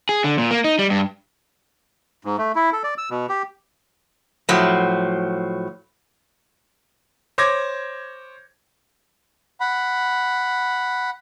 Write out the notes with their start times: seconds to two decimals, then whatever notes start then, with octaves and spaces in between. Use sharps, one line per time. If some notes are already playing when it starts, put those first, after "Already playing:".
0.09 G#4
0.24 D3
0.38 A#2
0.51 A#3
0.64 D#4
0.79 G3
0.90 G2
2.25 G#2
2.38 A3
2.56 E4
2.72 A4
2.84 D5
2.98 E6
3.10 B2
3.29 G4
4.49 A2 F3 F#3
7.38 C5 C#5 D6 G#6 A#6
9.60 F#5 B5